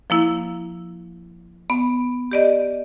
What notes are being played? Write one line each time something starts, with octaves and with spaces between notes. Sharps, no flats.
F3 A#3 E4
B3
G4 D5 D#5